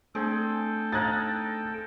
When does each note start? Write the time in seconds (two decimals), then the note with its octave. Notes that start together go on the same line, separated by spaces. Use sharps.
0.15 A3 C4 D4 G#4 A4 G5
0.92 D#4 D#5 F5 F#6 G#6 A6